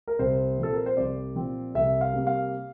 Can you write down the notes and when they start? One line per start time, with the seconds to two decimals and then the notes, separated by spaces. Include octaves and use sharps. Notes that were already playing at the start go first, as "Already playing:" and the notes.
0.08 A#4
0.19 C2 C5
0.58 A#2 F3 C4 A4
0.74 A#4
0.86 C5
0.97 C2 D5
1.36 A#2 F3 C4
1.75 C2 E5
2.01 F5
2.14 C3 G3 A#3
2.27 F5